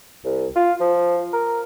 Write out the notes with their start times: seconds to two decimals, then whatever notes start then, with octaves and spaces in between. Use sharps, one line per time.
0.25 C2
0.56 F4
0.80 F3
1.33 A#4